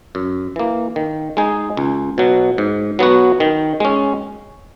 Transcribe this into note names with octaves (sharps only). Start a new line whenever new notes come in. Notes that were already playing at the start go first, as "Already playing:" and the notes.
F#2
E3 A#3
D#3
G#3 D#4 G#4
C#2
B2 F#3
G#2
F#3 B3 F#4
D#3
G#3 C#4